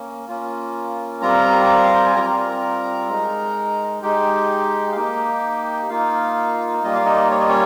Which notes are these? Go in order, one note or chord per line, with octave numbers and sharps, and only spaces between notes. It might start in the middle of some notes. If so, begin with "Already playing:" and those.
Already playing: A#3 C#4
A#3 C#4 F4
G3 C4 F4 A#4 A#5
F5
G5
G#5
G3 C4 F4 A#4 A#5
G#3 D#4
G#3 D#4 G4 G5
F5
A#3 D#4 G4 G5
A#3 D#4 F4 F5
G3 A#3 F4 D#5
F5
D#4 D#5
C#5
D#5
C#4 C#5